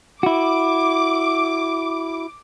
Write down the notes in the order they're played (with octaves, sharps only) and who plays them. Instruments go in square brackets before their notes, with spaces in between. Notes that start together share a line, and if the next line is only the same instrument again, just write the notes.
[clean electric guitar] E4 F#4 [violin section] D6